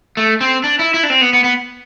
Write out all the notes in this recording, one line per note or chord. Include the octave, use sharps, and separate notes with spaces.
A3
C4
D4
E4
E4
D4
C4
B3
B3
B3